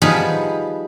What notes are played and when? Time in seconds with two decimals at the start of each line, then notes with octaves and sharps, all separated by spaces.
0.02 F3 G3 B3 D#4 G#4 B4